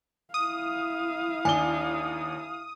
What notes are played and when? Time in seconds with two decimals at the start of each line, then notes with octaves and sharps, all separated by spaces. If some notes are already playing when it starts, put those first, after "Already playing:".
0.34 E4 F5 D#6
1.45 D#2 D4 G#5 G7